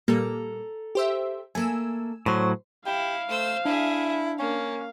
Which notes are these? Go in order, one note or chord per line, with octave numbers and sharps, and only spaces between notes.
A#2 G3 A#3 A4 A#5
G4 C5 E5
A3 A#3 G#5 E6
A2 F#3 C5
E4 G4 F5
A3 C5 E6
D4 E4 G#4 E5
A#3 C#4 F5